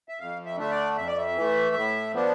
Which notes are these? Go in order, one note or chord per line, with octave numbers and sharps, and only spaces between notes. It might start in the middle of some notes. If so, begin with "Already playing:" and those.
E5
F2 F5
E5
D3 A3 D4 E5
D5
F2 E5
D5
E5
E3 A3
A2
F3 B3 D4